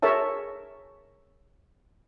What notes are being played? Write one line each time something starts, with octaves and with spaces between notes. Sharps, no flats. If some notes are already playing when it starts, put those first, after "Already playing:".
G#4 A#4 C#5 E5 A5